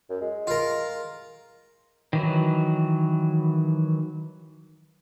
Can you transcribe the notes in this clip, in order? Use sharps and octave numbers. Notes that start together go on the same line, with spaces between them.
F#2
G#3
F4 A#4
D#3 E3 F#3